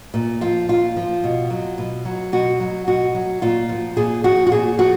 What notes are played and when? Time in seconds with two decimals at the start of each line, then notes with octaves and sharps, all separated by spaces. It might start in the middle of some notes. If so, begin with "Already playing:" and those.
0.14 A#2
0.41 F3 F4
0.69 A#2 F4
0.97 F3
1.24 B2
1.50 F#3
1.78 B2
2.05 F#3
2.32 B2 F#4
2.60 F#3
2.87 B2 F#4
3.15 F#3
3.42 A#2 F4
3.69 F3
3.97 A#2 G#4
4.24 F3 F#4
4.47 F#4
4.52 A#2 G#4
4.79 F3 F#4